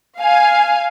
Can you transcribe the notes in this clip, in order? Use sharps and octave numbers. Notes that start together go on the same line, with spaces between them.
F5 G#5